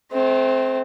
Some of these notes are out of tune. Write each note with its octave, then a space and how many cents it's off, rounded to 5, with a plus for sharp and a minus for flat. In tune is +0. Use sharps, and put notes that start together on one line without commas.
A3 -40 C4 +0